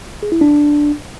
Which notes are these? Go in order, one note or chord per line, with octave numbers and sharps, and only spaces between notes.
G#4
E4
D4